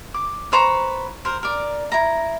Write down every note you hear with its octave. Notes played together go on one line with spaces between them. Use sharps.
D6
B4 C5 A#5 C#6
A#4 C5
A#4 D5
E4 A#5